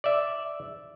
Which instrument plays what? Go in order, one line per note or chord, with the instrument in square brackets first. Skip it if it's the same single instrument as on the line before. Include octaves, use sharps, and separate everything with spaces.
[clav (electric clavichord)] D5 E5